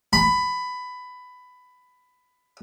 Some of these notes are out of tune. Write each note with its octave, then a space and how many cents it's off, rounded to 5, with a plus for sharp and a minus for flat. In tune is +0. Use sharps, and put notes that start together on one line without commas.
B5 +15